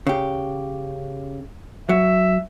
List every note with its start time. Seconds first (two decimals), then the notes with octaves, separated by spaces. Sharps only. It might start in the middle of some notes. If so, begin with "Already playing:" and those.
0.07 C#3 G4
1.89 F#3 E5